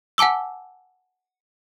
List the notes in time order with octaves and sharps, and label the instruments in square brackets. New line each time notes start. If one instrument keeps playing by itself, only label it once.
[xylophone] F#5 G#5 A5 D6 E6